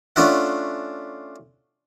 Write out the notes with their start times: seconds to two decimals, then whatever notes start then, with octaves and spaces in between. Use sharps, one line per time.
0.16 A3 C#4 D4 F4 E5 F#5